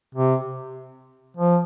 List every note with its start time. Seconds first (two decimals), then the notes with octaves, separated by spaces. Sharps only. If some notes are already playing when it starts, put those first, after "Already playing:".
0.15 C3
1.37 F3